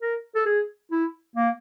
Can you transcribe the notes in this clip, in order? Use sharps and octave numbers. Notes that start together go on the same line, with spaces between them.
A#4
A4
G#4
E4
A#3